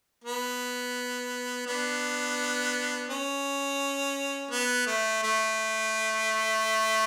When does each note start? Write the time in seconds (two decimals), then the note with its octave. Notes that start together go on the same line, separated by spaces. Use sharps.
0.24 B3
1.66 B3 D4
3.09 C#4
4.51 B3
4.87 A3
5.23 A3